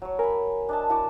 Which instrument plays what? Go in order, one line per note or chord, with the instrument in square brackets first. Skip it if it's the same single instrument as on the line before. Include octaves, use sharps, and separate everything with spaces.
[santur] F#3 C#6
[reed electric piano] A#4 [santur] G#5 B5
[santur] D4 D#5 A5
E4 F#4 D5